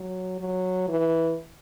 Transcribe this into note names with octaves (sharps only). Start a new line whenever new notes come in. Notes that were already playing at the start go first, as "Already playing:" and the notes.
Already playing: F#3
F#3
E3